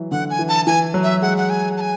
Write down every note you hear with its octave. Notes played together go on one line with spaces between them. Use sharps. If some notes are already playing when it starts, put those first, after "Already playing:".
Already playing: E3 F#3
D3 F#5
G#5
E3
A5
E3 G#5
F#3
E5
G#3 F#5
F#5
G#5
A5
G#5